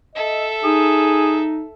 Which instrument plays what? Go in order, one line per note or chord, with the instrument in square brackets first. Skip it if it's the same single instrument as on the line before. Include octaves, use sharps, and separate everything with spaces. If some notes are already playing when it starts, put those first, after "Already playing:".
[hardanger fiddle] A4 E5 [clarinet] D#5
[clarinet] D#4 [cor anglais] G#4